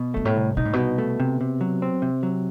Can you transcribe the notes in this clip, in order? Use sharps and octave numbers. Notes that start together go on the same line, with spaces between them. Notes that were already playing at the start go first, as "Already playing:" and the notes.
Already playing: B2
G2 A3
A2
C2
B2 D#4
A2
C2 B2
A3
C3
C3
F#3
C4
C3
F#3